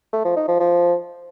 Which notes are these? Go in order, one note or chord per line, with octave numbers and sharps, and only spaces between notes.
A3
F3
D#4
F3
F3